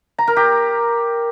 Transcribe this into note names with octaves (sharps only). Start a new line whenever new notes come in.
A#5
A#4
G4